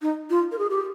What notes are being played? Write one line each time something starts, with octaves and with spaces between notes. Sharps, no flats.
D#4
F4
A#4
G#4
G4